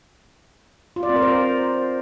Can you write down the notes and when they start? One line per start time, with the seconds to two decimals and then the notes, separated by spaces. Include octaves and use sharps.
0.96 F4
1.03 D5
1.09 C4
1.16 A#4
1.22 C5